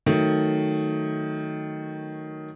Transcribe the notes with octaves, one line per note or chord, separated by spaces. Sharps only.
D#3 F#3 A3